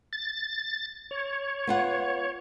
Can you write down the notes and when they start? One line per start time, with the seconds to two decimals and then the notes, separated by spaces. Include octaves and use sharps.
0.13 A6
1.11 C#5
1.67 B3 F4 F#5